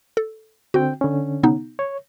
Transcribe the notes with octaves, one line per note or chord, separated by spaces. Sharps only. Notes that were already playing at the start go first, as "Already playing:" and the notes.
A4
D3 C4 F#4 G5
D3 C#4
C3 B3 D#4
C#5